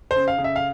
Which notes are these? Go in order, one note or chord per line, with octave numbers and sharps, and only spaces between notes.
C5
C#3
F5
C#3
E5
F5